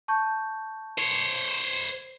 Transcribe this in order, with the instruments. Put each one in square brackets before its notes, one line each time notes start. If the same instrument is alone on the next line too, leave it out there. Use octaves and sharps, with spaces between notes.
[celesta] A5 C#6 G6
[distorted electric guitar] C5 C#5